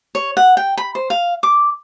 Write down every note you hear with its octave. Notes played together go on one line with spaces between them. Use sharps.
C#5
F#5
G5
B5
C5
F5
D6